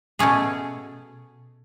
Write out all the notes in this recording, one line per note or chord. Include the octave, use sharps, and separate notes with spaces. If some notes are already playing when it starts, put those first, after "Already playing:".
B2 A3 C#4 G#4